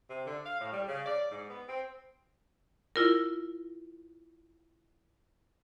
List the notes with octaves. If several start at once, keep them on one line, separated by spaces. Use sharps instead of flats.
C3
D3
F5
A2
G3
C#3
D5
G#2
B3
C4
E4 F4 A#4